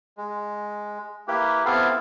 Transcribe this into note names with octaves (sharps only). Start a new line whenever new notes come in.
G#3
A#3 E4 G4 B4
B3 C4 E4 A4 F5